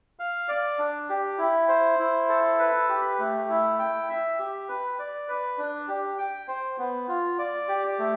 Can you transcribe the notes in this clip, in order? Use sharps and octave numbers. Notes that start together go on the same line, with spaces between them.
F5
D5
D4
G4
E4
C5
E4
A4
B4
G4
A3
E4
G5
E5
G4
B4
D5
B4
D4
G4
G5
C5
B3
F4
D5
G4
A3